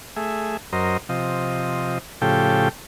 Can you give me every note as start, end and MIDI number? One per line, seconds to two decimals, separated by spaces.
0.16 0.57 57
0.16 0.57 68
0.16 0.57 76
0.73 0.97 42
0.73 0.97 70
0.73 0.97 72
0.73 0.97 75
1.09 1.98 48
1.09 1.98 53
1.09 1.98 75
2.21 2.69 45
2.21 2.69 49
2.21 2.69 53
2.21 2.69 67
2.21 2.69 69
2.21 2.69 79